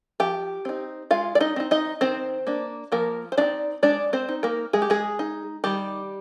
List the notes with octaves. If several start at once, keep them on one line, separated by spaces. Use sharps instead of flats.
F3 G4 G5
C4 D#4
G#3 F4 F5
D5
D#4 D#5
C4 D#4
D#4 D#5
D#3 C4 C5
A#3 D4
F3 A#3 A#4
C5
C4 D4 D#4 D5
G#3 D4 D5
C4 C5
D#4
A#3 A#4
G#3 G#4
G4
G#3 G#4
D#4
D#3 G3 G4